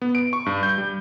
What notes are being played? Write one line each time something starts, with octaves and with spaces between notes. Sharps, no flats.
B3
D7
C#6
G2
G6
G3